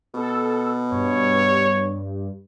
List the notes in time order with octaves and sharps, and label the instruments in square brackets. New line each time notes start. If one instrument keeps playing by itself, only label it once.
[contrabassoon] B2 [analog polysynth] A4
[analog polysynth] G2 [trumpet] C#5